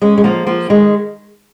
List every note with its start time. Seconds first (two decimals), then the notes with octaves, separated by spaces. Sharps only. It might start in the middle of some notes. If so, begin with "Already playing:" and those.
0.02 G#3 C#4
0.18 G#3
0.24 F3 A#3
0.47 F3 A#3
0.70 D#3 G#3